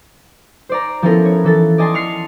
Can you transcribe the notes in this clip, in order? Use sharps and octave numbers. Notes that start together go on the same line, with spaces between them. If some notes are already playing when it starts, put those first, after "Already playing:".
C5 D5 A#5
F3 B3 C#4 E4 A4 A#4
C#5
E3 A4 A6
D5 D#5 G#5 A5 C6
C#6 F6 C7